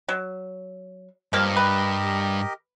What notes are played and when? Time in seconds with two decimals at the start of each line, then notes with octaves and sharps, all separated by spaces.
0.08 F#3
1.33 G2 F3 A#3 G4 A#4 D#5 F5
1.56 B4